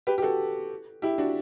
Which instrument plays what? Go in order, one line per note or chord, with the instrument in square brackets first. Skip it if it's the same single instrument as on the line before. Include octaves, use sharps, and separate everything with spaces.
[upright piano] G4 B4
G4
F#4 A4
E4 G4
D4 F#4